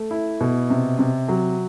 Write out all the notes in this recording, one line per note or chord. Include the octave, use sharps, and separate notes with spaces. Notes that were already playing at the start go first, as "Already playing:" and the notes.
Already playing: A3
E4
B2
C3
C3
F#3